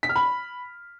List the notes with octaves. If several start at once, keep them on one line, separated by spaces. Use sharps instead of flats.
B6
F6
B5